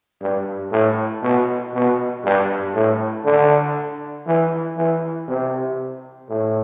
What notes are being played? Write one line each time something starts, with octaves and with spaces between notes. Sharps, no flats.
G2
A2
B2
B2
G2
A2
D3
E3
E3
C3
A2